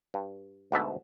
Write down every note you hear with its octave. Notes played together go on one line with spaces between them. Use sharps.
G2
D2 G#2 B2 E5 A5